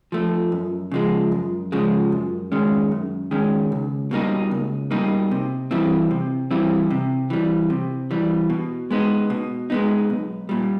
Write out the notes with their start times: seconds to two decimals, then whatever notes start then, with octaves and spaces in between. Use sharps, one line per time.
0.12 F3 A3
0.52 F#2
0.91 C#3 F3 G#3
1.32 F#2
1.72 C#3 F3 G#3
2.12 F#2
2.52 D#3 G#3 C#4
2.91 F#2
3.31 D#3 G#3 C#4
3.72 C#2
4.11 B2 G3 A#3 D#4
4.51 C#2
4.91 B2 G3 A#3 D#4
5.31 C3
5.71 E3 G3 C4 E4
6.11 C3
6.51 E3 G3 C4 E4
6.90 C3
7.30 E3 G3
7.70 C3
8.11 E3 G3
8.50 B2
8.91 G#3 B3 D#4
9.30 B2
9.70 G#3 B3 D#4
10.10 B1
10.49 A#2 G3